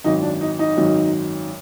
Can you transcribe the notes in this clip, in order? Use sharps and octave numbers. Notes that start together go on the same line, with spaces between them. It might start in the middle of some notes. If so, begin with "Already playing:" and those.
G#1 F#2 D#3 F#3 D#4
D4
D#4
D#4
G#1 F#2 D#3 F#3